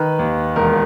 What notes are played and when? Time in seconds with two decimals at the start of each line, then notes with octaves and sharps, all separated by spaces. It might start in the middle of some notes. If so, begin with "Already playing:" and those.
Already playing: D#3 B4
0.19 D#2
0.56 E1 A#4